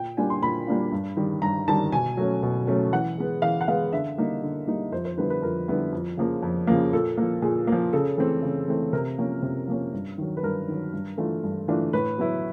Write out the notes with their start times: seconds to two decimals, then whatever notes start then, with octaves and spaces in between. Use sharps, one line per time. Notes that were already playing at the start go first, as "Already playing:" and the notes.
Already playing: A#2 G5
0.17 G3 A#3 D4 F4 G#5
0.30 C6
0.42 A#2 B5
0.67 G3 A#3 D4 F4
0.92 G2
1.17 D#3 G3
1.42 G2 A#5
1.68 D#3 G3 A5
1.92 B2 G#5
2.17 F#3 A3 C#4
2.43 B2
2.67 F#3 A3 C#4
2.92 E3 F#5
3.18 G#3 B3
3.42 E3 F5
3.61 F#5
3.68 G#3 B3 F5
3.93 D3 E5
4.18 G3 A#3 D#4
4.43 D3
4.67 G3 A#3 D#4
4.92 F2 C5
5.05 C5
5.17 D3 G3 B3 E4 B4
5.30 B4
5.42 F2 A#4
5.68 D3 G3 B3 E4
5.92 F2
6.17 C#3 F3 A#3
6.43 F2
6.67 C#3 F3 A#3
6.93 A#2 A4
7.18 F3 A#3
7.42 A#2 G#4
7.67 A#3
7.72 F3
7.93 C#3 A4
8.18 E3 A3 C4
8.43 C#3
8.68 E3 A3 C4
8.93 C3 A#4
9.18 F3 A#3 C#4
9.42 C3
9.68 F3 A#3 C#4
9.93 G2
10.18 D#3 F#3
10.37 B4
10.43 G2 A#4
10.68 D#3 F#3
10.93 G2
11.18 E3 A3 D4 F4
11.44 G2
11.68 E3 A3 D4 F4
11.93 A2 B4
12.18 F#3 B3 E4